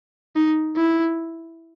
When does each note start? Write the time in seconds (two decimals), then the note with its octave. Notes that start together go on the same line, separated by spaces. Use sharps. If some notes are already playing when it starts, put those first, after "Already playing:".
0.36 D#4
0.77 E4